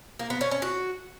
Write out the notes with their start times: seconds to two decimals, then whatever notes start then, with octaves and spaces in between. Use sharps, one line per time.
0.20 A#3
0.30 B3
0.41 C#4
0.51 C#4
0.62 F#4